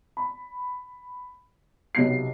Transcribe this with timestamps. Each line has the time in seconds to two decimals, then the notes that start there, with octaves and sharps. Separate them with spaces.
0.17 B5
1.95 B1 C3 B3 C7